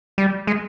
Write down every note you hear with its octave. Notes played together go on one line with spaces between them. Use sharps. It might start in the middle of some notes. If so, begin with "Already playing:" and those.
G3
G#3